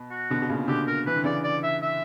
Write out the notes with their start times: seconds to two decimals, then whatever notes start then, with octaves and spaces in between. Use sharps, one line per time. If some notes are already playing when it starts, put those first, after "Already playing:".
Already playing: B2
0.11 F#4
0.30 B2 D3
0.42 B2
0.49 A#2 C#3
0.68 B2 D3 G4
0.87 A#4
1.06 E3 B4
1.16 D3
1.24 C#3 E3 D5
1.44 D5
1.63 E5
1.82 E5